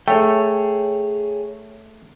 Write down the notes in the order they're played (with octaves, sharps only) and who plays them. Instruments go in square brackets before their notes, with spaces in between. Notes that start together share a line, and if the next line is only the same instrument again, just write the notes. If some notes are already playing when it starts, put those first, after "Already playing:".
[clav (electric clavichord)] A3 [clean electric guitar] G#4 C#5 G5